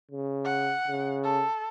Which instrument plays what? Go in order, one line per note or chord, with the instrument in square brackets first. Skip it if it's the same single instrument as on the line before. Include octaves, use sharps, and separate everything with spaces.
[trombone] C#3
[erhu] F#5
[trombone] C#3
[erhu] A4